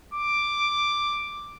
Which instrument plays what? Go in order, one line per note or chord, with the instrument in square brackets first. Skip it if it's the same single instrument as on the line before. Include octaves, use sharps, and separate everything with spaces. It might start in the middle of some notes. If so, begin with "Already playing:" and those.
[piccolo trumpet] D6